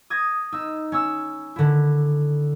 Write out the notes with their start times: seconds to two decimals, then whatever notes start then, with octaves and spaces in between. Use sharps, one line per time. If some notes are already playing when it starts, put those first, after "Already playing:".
0.10 D#6 G#6 A#6
0.52 D#4 E6
0.92 C#4 E6
1.56 D3 E4